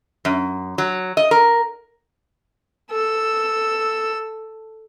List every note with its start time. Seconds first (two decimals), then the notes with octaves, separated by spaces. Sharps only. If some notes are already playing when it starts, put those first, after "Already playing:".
0.25 F#2
0.78 F#3
1.17 D#5
1.31 A#4
2.91 A4 E6